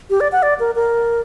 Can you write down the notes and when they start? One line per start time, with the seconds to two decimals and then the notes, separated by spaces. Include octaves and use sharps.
0.10 G4
0.20 D5
0.32 F#5
0.42 D5
0.59 A#4
0.75 A#4